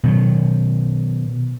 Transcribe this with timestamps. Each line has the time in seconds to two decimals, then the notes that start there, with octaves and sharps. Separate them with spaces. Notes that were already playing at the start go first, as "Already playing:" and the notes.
0.03 B2 D#3 F#3